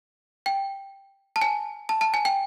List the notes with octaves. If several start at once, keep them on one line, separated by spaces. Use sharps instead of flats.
G5
A5
G#5
A5
A5
G#5
G5